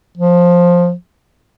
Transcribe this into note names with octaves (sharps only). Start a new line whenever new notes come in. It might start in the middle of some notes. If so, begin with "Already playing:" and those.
F3